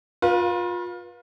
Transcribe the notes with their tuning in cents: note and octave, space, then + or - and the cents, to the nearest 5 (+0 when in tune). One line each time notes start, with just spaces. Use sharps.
F4 +25 B4 -30